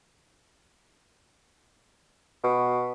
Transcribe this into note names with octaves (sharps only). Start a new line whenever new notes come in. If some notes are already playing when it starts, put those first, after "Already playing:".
B2